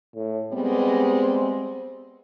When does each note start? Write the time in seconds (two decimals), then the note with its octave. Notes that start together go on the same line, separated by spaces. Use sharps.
0.15 A2
0.52 G3 G#3 B3 C4